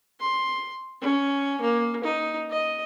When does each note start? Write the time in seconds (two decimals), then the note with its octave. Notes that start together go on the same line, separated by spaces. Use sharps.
0.20 C6
1.01 C#4
1.61 A#3
2.04 D#4
2.50 D#5